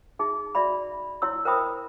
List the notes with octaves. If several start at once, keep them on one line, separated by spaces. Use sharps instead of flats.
D#4 G#4 E5
F#4 D5 E5 B5
E4 C#5 C6 E6
A#4 C5 E5 G5 B5 D#6